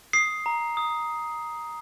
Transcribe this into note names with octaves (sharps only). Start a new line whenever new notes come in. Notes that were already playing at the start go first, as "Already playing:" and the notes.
D#6 C7
A#5
D#6